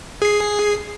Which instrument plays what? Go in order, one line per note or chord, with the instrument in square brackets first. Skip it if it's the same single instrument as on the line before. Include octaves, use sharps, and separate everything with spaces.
[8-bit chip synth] G#4 C7